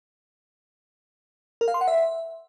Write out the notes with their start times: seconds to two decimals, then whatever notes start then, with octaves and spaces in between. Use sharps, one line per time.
1.61 A#4
1.68 F5
1.74 C6
1.81 F#5
1.88 E5